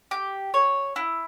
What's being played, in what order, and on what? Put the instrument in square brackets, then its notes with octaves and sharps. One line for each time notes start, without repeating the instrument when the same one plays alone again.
[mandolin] G4
C#5
E4